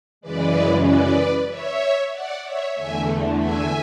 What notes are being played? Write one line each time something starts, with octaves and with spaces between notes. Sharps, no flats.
F#2 C#3 E3 G#3 B4 D5
B4 D5
C#5 E5
D5 F#5
C#5 E5
E2 D3 A3 E5 G#5
E5 G#5